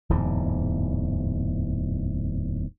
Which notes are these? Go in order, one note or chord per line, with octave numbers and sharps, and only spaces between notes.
D1 E2 G#2